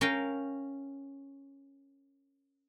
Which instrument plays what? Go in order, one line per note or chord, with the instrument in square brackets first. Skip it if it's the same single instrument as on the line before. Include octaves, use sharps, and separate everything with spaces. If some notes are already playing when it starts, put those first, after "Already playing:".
[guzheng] C#4 A#4 F5 G5